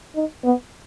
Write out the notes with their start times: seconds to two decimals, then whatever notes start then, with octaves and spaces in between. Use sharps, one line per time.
0.15 D#4
0.44 B3